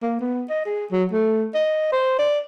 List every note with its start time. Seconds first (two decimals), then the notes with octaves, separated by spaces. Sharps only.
0.02 A#3
0.20 B3
0.50 D#5
0.65 G#4
0.91 F#3
1.12 A3
1.54 D#5
1.92 C5
2.19 D5